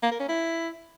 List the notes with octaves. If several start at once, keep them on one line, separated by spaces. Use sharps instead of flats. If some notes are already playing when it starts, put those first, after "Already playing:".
A#3
A#4
C#4
E4